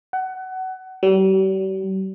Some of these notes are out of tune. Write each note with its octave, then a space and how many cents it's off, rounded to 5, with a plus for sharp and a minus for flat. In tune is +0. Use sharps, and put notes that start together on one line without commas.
F#5 +25
G3 -40